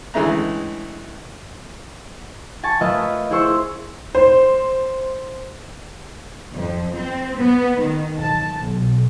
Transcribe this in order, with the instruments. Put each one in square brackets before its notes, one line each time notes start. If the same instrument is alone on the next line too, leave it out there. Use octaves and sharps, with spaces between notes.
[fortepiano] C#2 D3 E3 G#3 A3 A#5
[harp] G#5 A5 C#6
A3 F4 A#4 B4 D#5 E5
E4 G#4 C5 C#6 E6
[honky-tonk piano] C5
[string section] F2
C4
B3
D#3
A5
B1